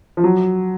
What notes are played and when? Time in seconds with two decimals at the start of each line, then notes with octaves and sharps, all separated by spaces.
0.17 F3
0.24 F#3